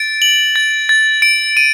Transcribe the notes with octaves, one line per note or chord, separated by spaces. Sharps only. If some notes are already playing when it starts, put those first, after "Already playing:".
Already playing: A6 D7
F#7
A6
A6
D7
D#7